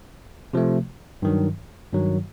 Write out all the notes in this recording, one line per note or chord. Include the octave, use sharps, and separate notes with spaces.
C3 F3 A3
G2 D#3 F#3
G2 D#3 F#3